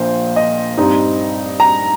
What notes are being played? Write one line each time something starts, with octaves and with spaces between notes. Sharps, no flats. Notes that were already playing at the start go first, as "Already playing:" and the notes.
Already playing: A#1 A#2 F3 C5
D#5
G2 G3 C4 D#4
A#5